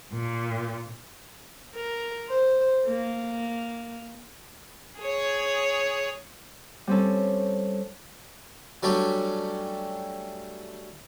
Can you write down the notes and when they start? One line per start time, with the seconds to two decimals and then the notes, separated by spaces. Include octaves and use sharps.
0.12 A#2
1.75 A#4
2.29 C5
2.87 A#3
4.99 G#4 C#5
6.87 G3 C4 C#4 A4
8.83 F#3 G3 A3 C#4 D4 G4